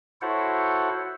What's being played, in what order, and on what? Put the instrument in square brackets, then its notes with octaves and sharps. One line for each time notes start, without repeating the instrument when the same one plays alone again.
[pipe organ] E4 F#4 A4 C5 C#5 F#5